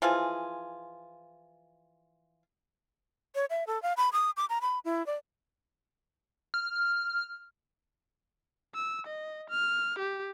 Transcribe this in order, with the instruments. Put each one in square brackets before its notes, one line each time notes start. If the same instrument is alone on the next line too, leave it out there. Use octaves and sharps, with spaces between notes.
[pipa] E3 F3 F4 G#4
[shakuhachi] C#5
E5
A4
F5
B5
D#6
D6
A#5
B5
E4
D5
[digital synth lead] F6
[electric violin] E6
D#5
F6
G4